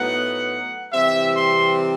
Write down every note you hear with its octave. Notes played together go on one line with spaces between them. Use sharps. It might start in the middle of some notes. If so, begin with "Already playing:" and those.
Already playing: A2 F#3 B3 D#4 F#5
C3 E3 G3 C4 E5
C6